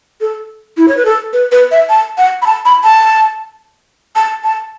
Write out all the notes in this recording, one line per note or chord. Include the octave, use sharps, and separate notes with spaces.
A4
E4
C#5
B4
A4
B4
B4
E5
A5
F#5
B5
A5
B5
A5
A5
A5